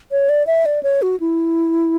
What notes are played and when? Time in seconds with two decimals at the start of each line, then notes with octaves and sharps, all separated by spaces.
0.12 C#5
0.29 D5
0.47 E5
0.66 D5
0.83 C#5
1.02 F#4
1.20 E4